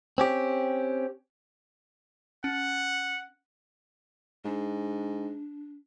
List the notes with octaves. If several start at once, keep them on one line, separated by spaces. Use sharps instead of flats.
C4 C#4 G4
C#4 F#5
G#2 D4